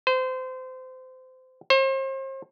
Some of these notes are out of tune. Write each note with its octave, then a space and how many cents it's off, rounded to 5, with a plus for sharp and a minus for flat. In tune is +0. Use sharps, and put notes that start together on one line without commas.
C5 -25
C5 +40